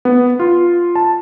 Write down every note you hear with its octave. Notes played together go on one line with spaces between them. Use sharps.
B3
F4
A5